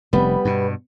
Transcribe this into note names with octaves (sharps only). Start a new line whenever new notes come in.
F1 G3 B3
G2 B2